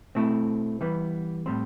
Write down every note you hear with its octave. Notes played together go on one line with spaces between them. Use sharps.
B2 A3 C4 E4
E3 G3 B3
A2 G3 C4